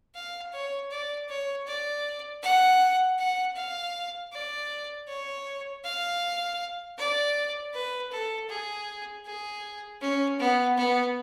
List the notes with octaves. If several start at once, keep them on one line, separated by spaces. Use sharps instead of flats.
F5
C#5
D5
C#5
D5
F#5
F#5
F5
D5
C#5
F5
D5
B4
A4
G#4
G#4
C#4
B3
B3